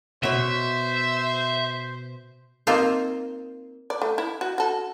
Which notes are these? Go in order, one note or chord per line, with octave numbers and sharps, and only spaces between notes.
B2 C5 C#5 E5
A#3 C4 D#4 F4 C5
D5
A3
E4
F#4
F#4 A4